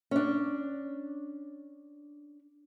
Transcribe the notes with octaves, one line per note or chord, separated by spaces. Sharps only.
C#4 D4